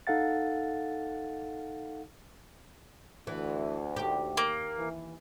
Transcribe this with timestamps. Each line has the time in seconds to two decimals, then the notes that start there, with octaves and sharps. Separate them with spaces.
0.07 D#4 A4 F5 F#5 A6
3.27 D2 E3
3.96 D#2 G4
4.37 A#3
4.78 E3